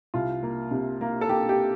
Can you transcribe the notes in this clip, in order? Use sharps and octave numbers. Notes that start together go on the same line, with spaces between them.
C2 F4
A#3
C3
A#3
A4
A#3 G4
G4